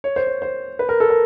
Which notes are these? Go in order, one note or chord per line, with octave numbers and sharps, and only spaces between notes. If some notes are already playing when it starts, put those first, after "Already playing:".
C#5
C5
C#5
C5
B4
A#4
A4
A#4